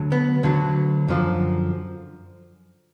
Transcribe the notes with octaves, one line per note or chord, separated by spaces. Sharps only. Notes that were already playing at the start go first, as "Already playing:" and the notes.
Already playing: D2 D3 F#3
B3
D2 D3 F#3
F#2 D3 F3